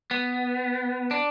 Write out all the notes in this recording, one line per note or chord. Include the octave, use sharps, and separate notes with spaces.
B3
D4